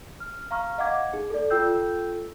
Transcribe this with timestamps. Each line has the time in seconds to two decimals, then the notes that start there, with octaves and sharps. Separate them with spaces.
0.20 F6
0.51 F5 A#5 C#6 F6
0.78 D#5 F5 F#5 D6 G#6
1.13 D#4 G#4
1.30 A4 D5
1.50 F4 A4 G5 E6 G6